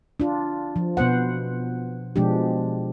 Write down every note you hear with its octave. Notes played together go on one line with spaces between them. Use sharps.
D4 F4
F3
B2 B3 C5 F#5
B2 F3 G#3 D4 G4